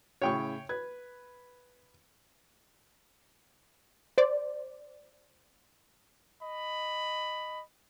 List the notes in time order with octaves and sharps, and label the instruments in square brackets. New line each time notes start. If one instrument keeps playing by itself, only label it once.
[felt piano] A2 C#3 [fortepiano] C#5 G5 C#6
[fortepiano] B4 [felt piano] G#6
[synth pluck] C5 D5
[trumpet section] D#5 B5